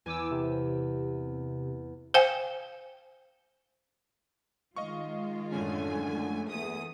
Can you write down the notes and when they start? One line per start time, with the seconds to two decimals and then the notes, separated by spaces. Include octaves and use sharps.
0.06 E2 G#5 D6 E6
0.31 C3
2.14 C5 F5 G5 G#5
4.76 D#3 G#3 F4 D#5 F5 C#6
5.52 F#2 A2 D3 A3 C#4 G#5
6.49 E2 E3 A3 A#3 G#4 D#6